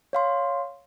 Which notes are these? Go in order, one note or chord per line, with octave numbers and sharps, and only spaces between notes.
C#5 F5 C6